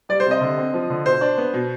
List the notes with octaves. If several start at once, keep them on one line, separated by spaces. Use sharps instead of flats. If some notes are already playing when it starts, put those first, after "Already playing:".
G3 D5
C5
C3
D#5
D3
C4
F3
D3
B2 C5
D4
B3
B2